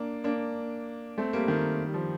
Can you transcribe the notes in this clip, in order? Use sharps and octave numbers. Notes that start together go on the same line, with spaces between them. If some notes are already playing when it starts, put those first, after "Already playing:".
Already playing: A#3 D4
A#3 D4
A3 C4
G3 A#3
D#3
G3
F3